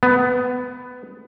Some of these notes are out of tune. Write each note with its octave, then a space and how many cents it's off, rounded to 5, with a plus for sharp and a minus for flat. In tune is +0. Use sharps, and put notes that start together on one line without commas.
B3 +15